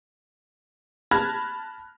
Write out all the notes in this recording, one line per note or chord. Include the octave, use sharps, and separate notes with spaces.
A5 B5 F6 F#6 G#6 A#6